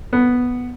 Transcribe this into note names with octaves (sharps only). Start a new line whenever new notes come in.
B3